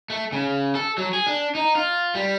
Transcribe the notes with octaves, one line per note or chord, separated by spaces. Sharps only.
A3
C#3
A4
F#3
G#4
D4
D#4
F4
G3